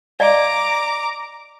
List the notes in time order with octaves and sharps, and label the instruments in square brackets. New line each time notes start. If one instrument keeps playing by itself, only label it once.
[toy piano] D5 D#5 F5 [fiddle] A#5 D6